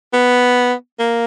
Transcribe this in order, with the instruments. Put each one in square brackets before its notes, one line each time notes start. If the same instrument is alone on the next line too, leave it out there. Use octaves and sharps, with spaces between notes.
[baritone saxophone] B3
A#3